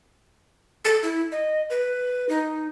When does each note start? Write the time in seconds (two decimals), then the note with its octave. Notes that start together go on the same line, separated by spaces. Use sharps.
0.85 A4
1.03 E4
1.32 D#5
1.70 B4
2.29 D#4